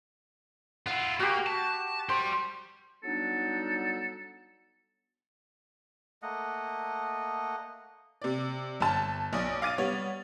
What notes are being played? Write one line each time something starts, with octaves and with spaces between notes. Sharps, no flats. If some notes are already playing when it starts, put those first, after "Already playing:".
E4 F4 F#5
A#3 F#4 G4
A5
G3 G4 C5
F#3 G3 B3 D4 D#4 A4
A3 A#3 D#5 F#5
C3 D5
G1 A5
B1 D5 D#6
F5 D6 A6 D#7
G3 B3 C#5